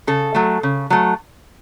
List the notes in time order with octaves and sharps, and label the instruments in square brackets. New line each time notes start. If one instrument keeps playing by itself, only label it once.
[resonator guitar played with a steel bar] C#3 A4
F#3 A3
C#3
F#3 A3